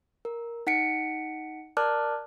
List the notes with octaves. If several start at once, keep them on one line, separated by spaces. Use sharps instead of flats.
A#4
D#4 F#5 B6 C#7 D7
A#4 D5 A5 D6 F6 F#6